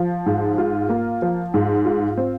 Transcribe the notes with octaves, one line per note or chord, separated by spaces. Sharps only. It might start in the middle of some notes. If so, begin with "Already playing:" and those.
Already playing: F3
G#2
F4
A#3
F3
G#2
F4
C4